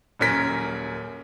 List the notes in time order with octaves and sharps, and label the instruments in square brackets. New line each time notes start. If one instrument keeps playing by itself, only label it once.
[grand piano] D#1 F#2 C#4 A#4 B6